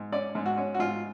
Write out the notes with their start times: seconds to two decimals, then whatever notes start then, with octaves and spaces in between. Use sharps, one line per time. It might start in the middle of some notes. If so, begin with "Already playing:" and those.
Already playing: G#2
0.12 C#4 D5
0.35 G#2
0.46 F#4
0.58 C#4
0.74 F#4
0.79 G#2 F4